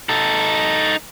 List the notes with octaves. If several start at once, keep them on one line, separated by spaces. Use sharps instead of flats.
D#4 A4